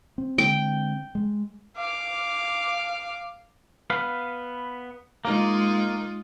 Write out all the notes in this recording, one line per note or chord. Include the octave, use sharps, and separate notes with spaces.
C4
D3 G#3 C4 G5
G#3
F5 D6
B3 B4 F5
G#3 A#3 D#4 F4